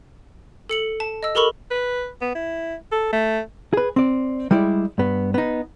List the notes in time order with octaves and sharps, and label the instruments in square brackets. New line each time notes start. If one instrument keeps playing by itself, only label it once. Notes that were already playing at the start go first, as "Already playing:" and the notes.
[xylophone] A4 C#7 F#7
A5
D#5 E6
G4 A4 A#4 B5 C#6 F#7
[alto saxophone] B4
B3
E4
A4
A3
[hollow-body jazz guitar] G#4 B4
C4 D5
G3 G#3 E4 D5
G2 B3
B3 D#4